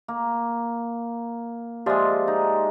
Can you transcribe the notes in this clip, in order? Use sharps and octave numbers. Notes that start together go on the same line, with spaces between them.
A#3
F3 G#3 G4 D5 E5
D#4